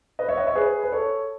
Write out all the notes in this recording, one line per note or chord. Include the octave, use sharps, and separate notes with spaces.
B4 D#5
C#5 E5
D#5 F#5
C#5 E5
G#4 B4
B4
A4 C#5